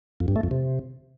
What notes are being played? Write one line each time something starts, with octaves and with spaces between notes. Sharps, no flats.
F2
G2
A3
F2
C3